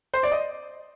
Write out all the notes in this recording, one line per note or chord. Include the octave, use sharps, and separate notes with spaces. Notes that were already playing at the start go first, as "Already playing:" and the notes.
C5
D5
D#5